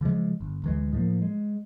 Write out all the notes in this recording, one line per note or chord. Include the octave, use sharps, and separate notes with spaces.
C#3 E3 F3 G#3
G1
D2 E3 G#3
A2 F3 A#3
G#3